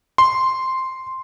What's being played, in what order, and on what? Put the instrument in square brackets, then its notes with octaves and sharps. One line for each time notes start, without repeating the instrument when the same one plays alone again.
[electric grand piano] C6